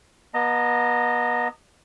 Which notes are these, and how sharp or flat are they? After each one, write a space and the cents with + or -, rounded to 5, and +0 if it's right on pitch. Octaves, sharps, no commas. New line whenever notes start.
B3 -35 D#5 +0 A#5 -40